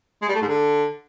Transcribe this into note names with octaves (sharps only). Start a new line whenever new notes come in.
G#3
G3
A3
G#2
D3